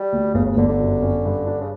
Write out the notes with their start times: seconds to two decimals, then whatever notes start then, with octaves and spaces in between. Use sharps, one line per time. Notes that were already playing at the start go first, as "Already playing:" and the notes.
Already playing: G3
0.12 D2
0.34 G1 C#3
0.46 C#3
0.57 G1 D3
0.69 D3
0.79 F#2
1.02 C#4
1.25 G2
1.47 D4
1.61 C#3